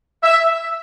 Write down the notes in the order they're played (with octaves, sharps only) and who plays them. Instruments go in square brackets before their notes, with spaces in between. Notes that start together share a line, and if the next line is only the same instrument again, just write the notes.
[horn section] E5